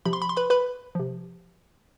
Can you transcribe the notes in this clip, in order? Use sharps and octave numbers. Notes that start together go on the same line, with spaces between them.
C3 F3 B5
C6
B5
C6
B4 B5
B4 B5
C3 F3